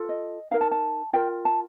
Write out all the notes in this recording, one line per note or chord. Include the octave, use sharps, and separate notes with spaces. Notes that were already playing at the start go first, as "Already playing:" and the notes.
Already playing: F4 A4
D#5
D#4 A#4 F5
A5
A5
F4 A#4 G5
A5